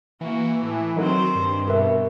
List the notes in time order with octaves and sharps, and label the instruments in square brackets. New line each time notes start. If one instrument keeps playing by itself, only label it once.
[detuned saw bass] E3 [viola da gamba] A#3 F#4
[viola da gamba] A2
[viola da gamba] D#3 C4 C5 [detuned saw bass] F#3 [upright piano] D#4 A#4
[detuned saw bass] G2
[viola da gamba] B2 [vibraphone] A#4 [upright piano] B4 E5